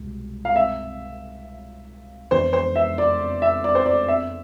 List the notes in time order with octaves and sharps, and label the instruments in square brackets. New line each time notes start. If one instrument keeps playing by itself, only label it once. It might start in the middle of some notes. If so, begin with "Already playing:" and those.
Already playing: [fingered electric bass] C2 B2 G#3
[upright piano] F5
E5
[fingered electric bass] F2 E3 B3 D4 [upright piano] C5
[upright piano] C5
E5
D5
E5
D5
C5
D5
E5